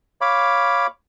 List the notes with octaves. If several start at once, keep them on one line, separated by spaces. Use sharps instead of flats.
C#5 F5 B5 D6